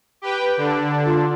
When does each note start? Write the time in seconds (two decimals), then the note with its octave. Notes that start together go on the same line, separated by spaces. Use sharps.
0.22 G4 B4 G5
0.57 D3 D4
1.05 F4